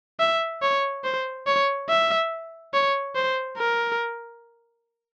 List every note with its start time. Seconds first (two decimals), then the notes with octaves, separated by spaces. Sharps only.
0.20 E5
0.62 C#5
1.04 C5
1.47 C#5
1.89 E5
2.73 C#5
3.15 C5
3.57 A#4